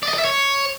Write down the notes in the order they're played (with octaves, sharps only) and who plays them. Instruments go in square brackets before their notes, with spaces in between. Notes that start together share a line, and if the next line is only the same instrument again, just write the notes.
[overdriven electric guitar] D5
D#5
D5
E5
C#5